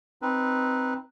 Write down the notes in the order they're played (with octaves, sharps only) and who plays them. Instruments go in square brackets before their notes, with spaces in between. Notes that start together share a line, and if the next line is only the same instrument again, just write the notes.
[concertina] C4 D#4 B4